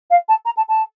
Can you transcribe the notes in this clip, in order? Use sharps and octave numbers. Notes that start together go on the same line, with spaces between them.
F5
A5
A#5
A5
A5